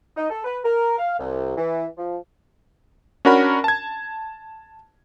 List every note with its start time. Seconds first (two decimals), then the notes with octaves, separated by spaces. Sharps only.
0.17 D#4
0.30 A4
0.44 B4
0.64 A#4
0.98 F5
1.19 C2
1.57 E3
1.98 F3
3.25 C#4 D4 F#4 A#4 F#5 B5
3.64 A5 G#6